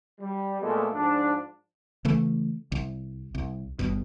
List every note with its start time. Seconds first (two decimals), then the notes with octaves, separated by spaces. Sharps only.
0.21 G3
0.61 A#2 G#3 A3 B3 A4
0.93 G#2 F3 D4
2.05 C#3 E3 A3
2.72 C2
3.35 C2
3.79 G1 G2 B2